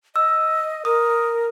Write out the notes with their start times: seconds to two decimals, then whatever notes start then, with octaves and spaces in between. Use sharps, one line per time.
0.16 D#5 E6
0.85 A#4 D#6